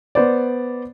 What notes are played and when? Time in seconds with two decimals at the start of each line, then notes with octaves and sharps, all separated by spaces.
0.15 B3 C5 D5